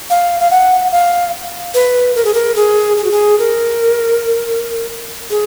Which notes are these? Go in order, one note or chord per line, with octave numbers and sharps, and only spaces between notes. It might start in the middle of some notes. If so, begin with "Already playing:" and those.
F5
F5
F#5
F5
B4
A#4
G#4
A#4
G#4
G#4
F#4
G#4
A#4
G#4